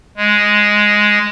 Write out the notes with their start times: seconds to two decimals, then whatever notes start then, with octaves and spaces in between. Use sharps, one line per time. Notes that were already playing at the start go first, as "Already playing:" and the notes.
0.17 G#3